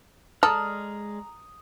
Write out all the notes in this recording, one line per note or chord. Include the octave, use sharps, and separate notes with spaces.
G#3 A4 D5 A#5 D#6 F6